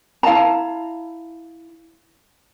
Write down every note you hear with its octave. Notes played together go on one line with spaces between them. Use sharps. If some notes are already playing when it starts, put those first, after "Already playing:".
E4 F5 A5 A#5